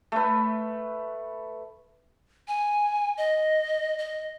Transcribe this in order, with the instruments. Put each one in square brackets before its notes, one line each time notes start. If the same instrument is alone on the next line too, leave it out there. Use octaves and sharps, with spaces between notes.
[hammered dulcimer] A3 B4
[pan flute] G#5
D#5
D#5